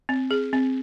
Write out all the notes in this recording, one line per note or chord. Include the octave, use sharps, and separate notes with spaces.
C4
G#4
C4